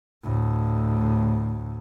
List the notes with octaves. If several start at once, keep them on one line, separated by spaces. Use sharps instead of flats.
D2 A2